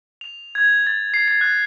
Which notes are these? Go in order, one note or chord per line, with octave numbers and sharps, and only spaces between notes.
F7
G#6
A6
C7
C7
F#6